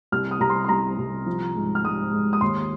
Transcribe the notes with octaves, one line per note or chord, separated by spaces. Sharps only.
C2 F6
D#6
C2 A#5
C6
C6
C2 A#5
C2
F3
G#2
F6
G#2 D#6
G#2
D#6
D#2 C6